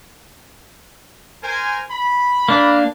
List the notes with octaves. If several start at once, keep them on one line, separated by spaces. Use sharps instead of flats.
A#4 C5 G#5
B5
A#3 D4